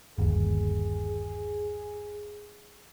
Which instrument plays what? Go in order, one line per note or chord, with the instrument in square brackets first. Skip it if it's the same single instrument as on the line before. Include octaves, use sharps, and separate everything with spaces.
[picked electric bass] G1 D#2 [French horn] G#4